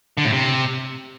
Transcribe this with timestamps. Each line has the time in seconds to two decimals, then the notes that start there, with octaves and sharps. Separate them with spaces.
0.18 D3
0.25 A2
0.33 C3